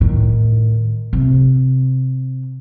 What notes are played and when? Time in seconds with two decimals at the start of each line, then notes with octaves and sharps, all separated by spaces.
0.01 A2 D#3
1.13 C3